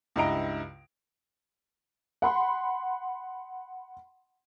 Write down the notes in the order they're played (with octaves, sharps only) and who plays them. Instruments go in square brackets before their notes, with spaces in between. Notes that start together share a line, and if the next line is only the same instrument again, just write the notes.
[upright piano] C#2 G2 E4 D#5 A#5 D7
[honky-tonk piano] F#5 B5 C6